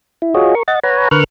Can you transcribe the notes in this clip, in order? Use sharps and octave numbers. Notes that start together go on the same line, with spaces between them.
E4
F4 F#4 G#4 C#5 D#5
A#4 C#6
D#5 F#5 A6
B4 C#5 F#5 G#5 A#5
D3 A#4 B4 C#6 F6 F#6